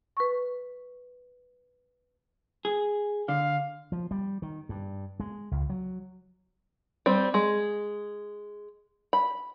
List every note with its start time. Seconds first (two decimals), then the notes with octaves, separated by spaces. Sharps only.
0.17 B4 C#6
2.65 G#4
3.29 D3 F5
3.92 F3
4.11 G3
4.42 D#3
4.69 G2
5.20 G#3
5.51 C#2
5.70 F#3
7.06 G3 C4
7.34 G#3
9.13 B5